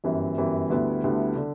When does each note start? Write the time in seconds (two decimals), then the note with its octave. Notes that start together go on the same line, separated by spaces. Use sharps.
0.04 G1 F#2 E3 G3
0.37 G1 F#2 E3 G3
0.70 D2 D3 G3 B3 E4
1.04 D2 D3 G3 B3 E4
1.36 D3